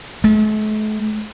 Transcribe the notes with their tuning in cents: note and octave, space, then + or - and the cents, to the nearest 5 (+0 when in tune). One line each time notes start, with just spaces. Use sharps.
A3 -45